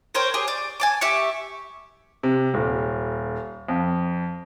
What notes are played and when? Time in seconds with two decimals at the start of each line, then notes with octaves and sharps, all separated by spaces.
0.15 A#4 C5 C#5 G5
0.34 G4 G#4
0.48 D5
0.80 G#5 A5 D6
1.01 G4 E5 C#6
2.23 C3
2.54 D#1
3.68 F2